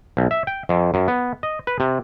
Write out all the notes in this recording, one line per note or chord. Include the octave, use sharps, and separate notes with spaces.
B1
E5
G5
F2
F#2
B3
D#5
B4
C3